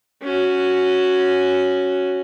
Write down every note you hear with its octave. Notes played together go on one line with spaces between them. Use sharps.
C#4 F#4